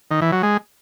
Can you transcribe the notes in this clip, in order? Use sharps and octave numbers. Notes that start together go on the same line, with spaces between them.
D#3
E3
F#3
G#3